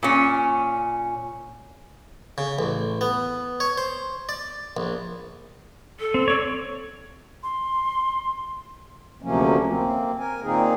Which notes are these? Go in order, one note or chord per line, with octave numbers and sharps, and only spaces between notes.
A#2 C#4
C#3
A1
B3
C#5
C5
D5
A#1
A4
C4
A4 C#5 D5
C6
D2 C3 F3 F#3 A#3 C#4
A#3 C4
A#4 G#5
A#2 D#3 A#3 C4 D#4 G#4